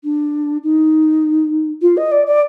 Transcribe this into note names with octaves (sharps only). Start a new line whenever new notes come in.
D4
D#4
F4
D#5
D5
D5